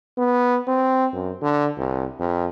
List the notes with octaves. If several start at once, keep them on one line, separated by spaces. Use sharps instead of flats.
B3
C4
F#2
D3
C2
F2